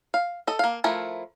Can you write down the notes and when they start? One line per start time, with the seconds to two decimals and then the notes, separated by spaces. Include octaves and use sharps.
0.14 F5
0.47 A4 D#5
0.59 A#3 F5
0.84 F3 A3 E4 A#4